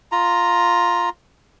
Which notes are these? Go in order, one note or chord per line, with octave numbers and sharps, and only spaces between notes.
F4 A#5